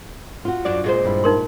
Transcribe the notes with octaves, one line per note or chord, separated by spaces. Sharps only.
F4 F#4
F#2 D4 D5
A#2 G#3 C5
G2 E4
D#4 A#4 C6